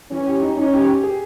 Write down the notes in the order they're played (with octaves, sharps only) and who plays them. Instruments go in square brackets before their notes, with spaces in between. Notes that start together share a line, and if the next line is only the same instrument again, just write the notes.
[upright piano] E3 [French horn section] C#4
[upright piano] G4
D#4
[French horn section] C#4 [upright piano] D#4
[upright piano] G4
G4
G#4